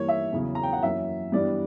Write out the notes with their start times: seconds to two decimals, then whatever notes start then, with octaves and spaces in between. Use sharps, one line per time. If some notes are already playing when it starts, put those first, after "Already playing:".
Already playing: G2 E3 A#3 C#5
0.08 E5
0.33 E2 C#3 F#3 B3
0.55 A#5
0.63 G5
0.73 F#5
0.83 F#2 E3 A#3 C#4 E5
1.32 G2 E3 G3 B3 D4 D5